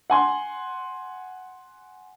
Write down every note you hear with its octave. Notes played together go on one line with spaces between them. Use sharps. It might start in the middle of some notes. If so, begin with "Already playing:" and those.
F#5 G#5 C6